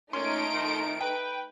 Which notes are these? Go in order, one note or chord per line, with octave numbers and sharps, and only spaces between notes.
A#2 A3 C#4 D#4 C6 D7
F2 A2 D#3
B4 G5